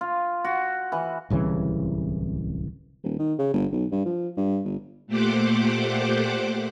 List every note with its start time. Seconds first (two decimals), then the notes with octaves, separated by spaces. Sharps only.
0.01 F4
0.44 F#4
0.92 E3
1.30 D1 C2 C#3 E3
3.03 D#1
3.19 D#3
3.39 C#3
3.53 G1
3.72 B1
3.92 G2
4.06 F3
4.37 G2
4.64 G1
5.07 A#2 A3 G4 C5 F#5 D6